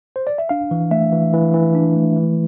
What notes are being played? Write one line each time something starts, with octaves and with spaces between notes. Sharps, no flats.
C5
D5
E5
D4 F5
E3
A3 E5
E3
E3
E3
D4
A3
E3